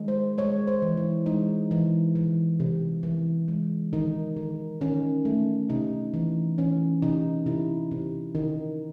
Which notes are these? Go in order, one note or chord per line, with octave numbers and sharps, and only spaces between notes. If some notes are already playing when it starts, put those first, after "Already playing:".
Already playing: D#3 G#3
C5
G#3 C#5
C5
E3
E4
G#3 D#4
E3
E3
C3
E3
G#3
D#3 D#4
D#3
D#3 C#4
A3
C3 D#4
E3
E3 C#4
C3 D#4
C3 E4
C3
D#3 D#4